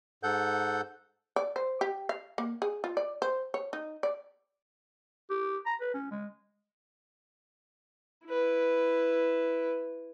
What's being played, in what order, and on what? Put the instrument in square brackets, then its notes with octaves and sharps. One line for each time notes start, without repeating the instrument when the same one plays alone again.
[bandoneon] G#2 A4 F#5 G6
[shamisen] D5
C5
G4
F5
A#3
G#4
F4
D5
C5
C#5
D#4
D5
[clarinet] G4
A#5
B4
C#4
G#3
[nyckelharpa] E4 B4